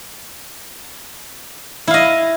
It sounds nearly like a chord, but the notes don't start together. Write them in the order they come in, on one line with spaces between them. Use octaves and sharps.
E4 F5 D#5